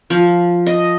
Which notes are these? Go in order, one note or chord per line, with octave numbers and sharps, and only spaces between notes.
F3
D#5